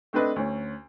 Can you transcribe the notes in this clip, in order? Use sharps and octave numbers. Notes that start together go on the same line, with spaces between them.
A3 C4 D4 B4 D#5
D2 C#4